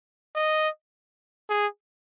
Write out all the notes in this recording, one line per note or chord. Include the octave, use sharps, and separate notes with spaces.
D#5
G#4